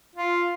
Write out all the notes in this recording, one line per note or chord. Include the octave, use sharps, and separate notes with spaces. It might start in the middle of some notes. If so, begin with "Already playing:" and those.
F4